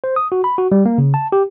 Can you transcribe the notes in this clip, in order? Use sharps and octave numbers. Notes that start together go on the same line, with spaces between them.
C5
D#6
F#4
B5
F#4
G3
A#3
C#3
A5
G4